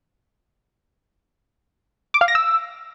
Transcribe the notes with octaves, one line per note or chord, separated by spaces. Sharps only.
D6
F5
A#6
E6